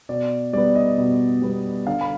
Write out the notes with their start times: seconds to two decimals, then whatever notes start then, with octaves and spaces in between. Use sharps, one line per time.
0.09 B2 D5
0.53 G3 B3 D5
0.75 D#5
0.98 B2
1.42 G3 B3
1.87 D3 F5
2.01 B5